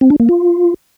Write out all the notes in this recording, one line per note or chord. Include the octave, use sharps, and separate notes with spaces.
C4
D4
A#3
F4